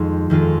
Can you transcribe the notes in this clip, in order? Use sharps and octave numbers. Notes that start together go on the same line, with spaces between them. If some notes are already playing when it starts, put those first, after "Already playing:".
Already playing: F2 D#3 G#3 F4
F2 D#3 G#3 F4